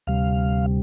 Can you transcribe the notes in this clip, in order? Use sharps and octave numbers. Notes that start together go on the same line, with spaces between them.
D2 C3 G3 F5